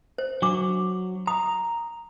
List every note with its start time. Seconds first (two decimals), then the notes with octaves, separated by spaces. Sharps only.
0.18 C5
0.42 F#3 D4 D6
1.27 A#5 D#6